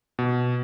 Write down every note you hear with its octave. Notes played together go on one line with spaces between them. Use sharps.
B2